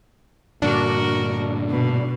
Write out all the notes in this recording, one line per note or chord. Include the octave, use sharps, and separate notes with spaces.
G2 A#2 D3 D4 F#4 A#4
B2